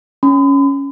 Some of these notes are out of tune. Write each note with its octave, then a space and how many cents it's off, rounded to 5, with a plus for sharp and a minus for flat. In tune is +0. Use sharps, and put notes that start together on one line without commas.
C#4 +0 B5 +45